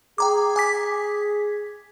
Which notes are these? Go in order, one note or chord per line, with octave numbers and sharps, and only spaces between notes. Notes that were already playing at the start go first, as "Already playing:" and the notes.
G#4 G5 A#5 D6
G#5 D6 B6